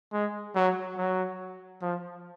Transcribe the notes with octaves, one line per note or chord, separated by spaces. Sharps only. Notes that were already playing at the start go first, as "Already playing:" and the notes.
G#3
F#3
F#3
F3